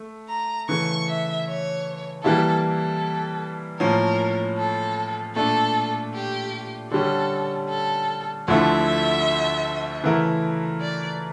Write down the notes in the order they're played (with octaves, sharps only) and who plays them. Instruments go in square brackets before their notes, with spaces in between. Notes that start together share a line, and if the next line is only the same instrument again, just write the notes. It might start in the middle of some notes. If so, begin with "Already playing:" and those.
Already playing: [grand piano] A3
[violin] A#5
[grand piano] C#3 E3 A3 [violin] C#6
[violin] E5
C#5
[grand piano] E3 G3 A#3 E4 [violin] A4
[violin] A4
[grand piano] A2 F3 A#3 C#4 [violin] A#4
[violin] A4
[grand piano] A#2 A3 D4 [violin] A4
[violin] G4
[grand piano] D3 G3 C#4 [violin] A4
[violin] A4
[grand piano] D2 D3 F3 A3 E4 [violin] E5
[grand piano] C#3 E3 A3 E4 A#4
[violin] D5